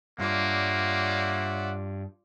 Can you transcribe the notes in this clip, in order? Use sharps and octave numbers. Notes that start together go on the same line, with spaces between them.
G2 A#3 F4 C#5 D5 E5 F#5